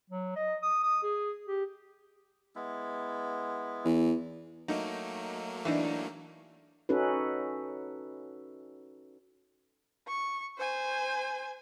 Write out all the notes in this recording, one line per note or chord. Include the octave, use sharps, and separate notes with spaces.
F#3
D#5
D#6
D#6
G#4
G4
G#3 B3 E4
E2
F#3 A3 A#3 D#4
E3 D4 D#4
C#4 D#4 F#4 A4 B4
C#6
C5 G#5